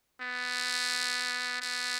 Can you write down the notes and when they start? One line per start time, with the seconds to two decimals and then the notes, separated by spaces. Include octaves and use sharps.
0.21 B3
1.61 B3